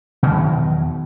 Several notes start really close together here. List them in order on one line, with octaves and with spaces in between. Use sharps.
B2 D#3 E2 F#3